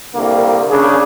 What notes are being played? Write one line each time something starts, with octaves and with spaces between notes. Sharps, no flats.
C2 D3 A#3
C#3 D4 G#4